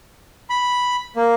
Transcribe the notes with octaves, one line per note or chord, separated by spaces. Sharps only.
B5
A#3